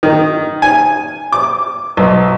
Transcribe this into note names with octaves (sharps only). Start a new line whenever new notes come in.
D#3
G#5
D6
B1